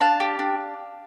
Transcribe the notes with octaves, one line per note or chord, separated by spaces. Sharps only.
D4 F5 A5
G4
D4